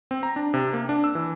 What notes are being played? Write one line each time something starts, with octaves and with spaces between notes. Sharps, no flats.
C4
A#5
D4
C3
A#3
D4
E6
E3